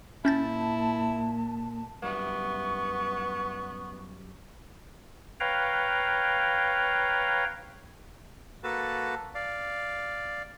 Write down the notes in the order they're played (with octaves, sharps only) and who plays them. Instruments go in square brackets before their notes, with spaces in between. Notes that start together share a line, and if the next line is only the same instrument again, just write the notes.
[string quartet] A#2 [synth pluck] C#4 G6 A6 [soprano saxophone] E4 [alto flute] A5
[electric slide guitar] F#2 G3 E4 [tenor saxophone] B3 [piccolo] C#6
[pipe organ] B4 C#5 F5 G5 A#5
[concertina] A#3 F#4 A4 B4 A5
D5 F5